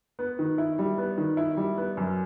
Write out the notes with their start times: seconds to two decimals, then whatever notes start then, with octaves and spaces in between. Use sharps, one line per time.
0.19 B3
0.39 D#3
0.58 E4
0.79 G3
0.98 B3
1.18 D#3
1.37 E4
1.57 G3
1.78 B3
1.97 F#2